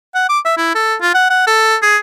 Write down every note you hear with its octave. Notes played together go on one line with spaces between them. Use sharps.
F#5
D6
E5
E4
A4
F4
F#5
F#5
A4
G#4